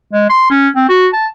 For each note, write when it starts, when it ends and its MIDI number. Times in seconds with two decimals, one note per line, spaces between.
0.13 0.27 56
0.29 0.49 84
0.50 0.69 61
0.76 0.85 60
0.89 1.07 66
1.13 1.27 81